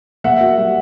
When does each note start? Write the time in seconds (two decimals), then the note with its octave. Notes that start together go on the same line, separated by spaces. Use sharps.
0.24 A#3 E5 F#5
0.41 F#4
0.58 G3